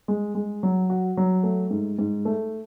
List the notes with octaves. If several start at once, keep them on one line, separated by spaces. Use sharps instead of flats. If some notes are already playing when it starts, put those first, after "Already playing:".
G#3
G#3
F#3
F#4
F#3
A3
G#2
G#2
A3